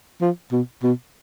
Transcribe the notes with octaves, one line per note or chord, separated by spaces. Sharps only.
F3
B2
B2